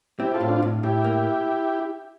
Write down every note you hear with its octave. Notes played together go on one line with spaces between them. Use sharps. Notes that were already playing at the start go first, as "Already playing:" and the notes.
C4 E4 G4
F4 A4
A2
D4 F4
A2
A2 E4 G4
A#3